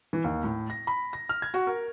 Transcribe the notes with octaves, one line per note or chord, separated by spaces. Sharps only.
E3
D#2
A2
A#6
B5
A#6
F6
G#6
F#4
A#4